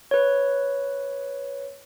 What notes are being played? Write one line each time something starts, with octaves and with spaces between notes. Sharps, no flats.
B4 C#5